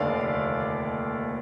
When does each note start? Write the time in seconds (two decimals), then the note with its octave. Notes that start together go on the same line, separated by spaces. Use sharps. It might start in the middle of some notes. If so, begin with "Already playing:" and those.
Already playing: F1 D#2 D3 D5 F5